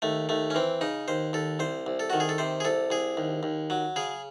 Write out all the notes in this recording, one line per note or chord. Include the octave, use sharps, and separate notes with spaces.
D#2 A3
D#2 A3
C#4
E3 C4
C#3 D#4
D#2 C5
D#2 A4
C2 C5
C2
A4
D#3 F#4
G#4
A4
C3 C5
G#4
C2 A4
C2 G#4
D#2
D#2
F#3
C#3 G#4